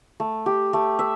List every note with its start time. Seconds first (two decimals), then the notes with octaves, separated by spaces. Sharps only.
0.20 A3
0.46 G4
0.73 A3
0.99 E5